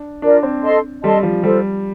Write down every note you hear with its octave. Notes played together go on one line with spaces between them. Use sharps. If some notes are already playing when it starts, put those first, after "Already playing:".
Already playing: D4
D4 F4 A#4 D5
C4
A4 D#5 A5 C6
G3 A4 D#5 A5 C6
F3
G3 F4 A4 C5